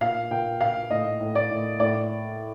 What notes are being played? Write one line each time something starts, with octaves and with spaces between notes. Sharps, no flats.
A#2 F5
A#2 G5
A#2 F5
A2 D#5
A2
D5
A2
A2 D5